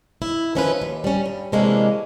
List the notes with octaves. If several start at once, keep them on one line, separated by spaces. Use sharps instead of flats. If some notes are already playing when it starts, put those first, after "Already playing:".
E4
D#3 F3 C#4 F4 G#4 B4
D#2
G3 C#4
G2
C3 E3 G#3 A#3 C#4 D4